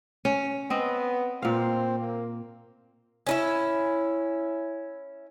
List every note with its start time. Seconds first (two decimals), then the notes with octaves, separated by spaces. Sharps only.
0.25 C#4
0.70 B3 C4 D#5
1.42 A#2 C4 F5
2.00 A#3
3.27 C#4 D#4 E4